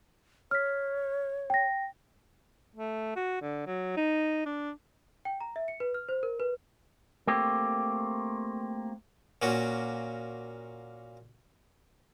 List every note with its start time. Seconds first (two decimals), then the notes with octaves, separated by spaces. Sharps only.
0.51 C#5 F6 B6
1.50 G5 A#6
2.75 A3
3.16 F#4
3.42 D3
3.67 F#3
3.97 D#4
4.46 D4
5.25 G5
5.41 A#5
5.56 E5
5.68 C#7
5.80 B4
5.94 F6
6.09 C5
6.23 A#4
6.40 B4
7.27 A3 A#3 C4 G4
9.42 A#2 A#3 C#4 F#4